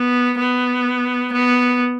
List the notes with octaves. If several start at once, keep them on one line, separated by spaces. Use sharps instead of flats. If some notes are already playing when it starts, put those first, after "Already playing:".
Already playing: B3
B3
B3